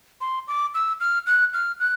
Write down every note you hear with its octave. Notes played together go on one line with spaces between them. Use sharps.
C6
D6
E6
F6
F#6
F6
F#6